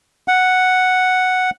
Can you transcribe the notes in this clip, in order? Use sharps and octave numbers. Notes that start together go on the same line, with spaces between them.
F#5